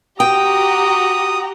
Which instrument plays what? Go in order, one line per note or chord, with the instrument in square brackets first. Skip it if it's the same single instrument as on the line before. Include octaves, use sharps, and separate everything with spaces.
[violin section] F#4 G4 A#5 [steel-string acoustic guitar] G5 [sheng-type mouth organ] D#6